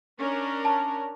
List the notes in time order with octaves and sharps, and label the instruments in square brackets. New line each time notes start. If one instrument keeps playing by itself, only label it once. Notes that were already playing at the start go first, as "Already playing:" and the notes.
[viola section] C#4 D4 A#4
[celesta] A5